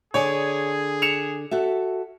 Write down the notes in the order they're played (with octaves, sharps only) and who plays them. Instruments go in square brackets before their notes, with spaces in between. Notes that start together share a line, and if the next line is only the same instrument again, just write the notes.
[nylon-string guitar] D3 D5 G#5 [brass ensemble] G#4 [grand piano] C#5
[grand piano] C#7 E7 F7
[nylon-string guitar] F#4 A4 E5